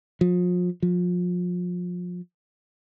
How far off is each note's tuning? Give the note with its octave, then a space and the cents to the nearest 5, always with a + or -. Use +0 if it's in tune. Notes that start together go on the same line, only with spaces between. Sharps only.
F3 +35
F3 +30